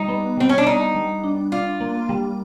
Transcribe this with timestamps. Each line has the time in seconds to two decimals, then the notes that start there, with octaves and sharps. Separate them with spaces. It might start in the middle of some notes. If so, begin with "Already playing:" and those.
Already playing: G3 D#4
0.08 B3
0.37 G3 C4
0.49 C#4
0.58 D4
0.66 B3 D#4
0.95 G3
1.24 D4
1.52 D4 F4
1.81 A#3
2.09 G3